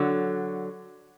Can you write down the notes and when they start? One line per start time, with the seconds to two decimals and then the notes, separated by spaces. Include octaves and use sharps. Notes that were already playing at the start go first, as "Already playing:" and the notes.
Already playing: D3 F#3